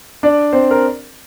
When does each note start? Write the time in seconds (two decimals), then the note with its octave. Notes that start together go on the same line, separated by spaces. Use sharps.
0.23 D4 D5
0.53 C4 C5
0.71 A#4